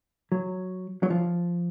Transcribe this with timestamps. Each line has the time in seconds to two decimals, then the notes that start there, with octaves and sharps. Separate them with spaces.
0.32 F#3
1.03 F#3
1.10 F3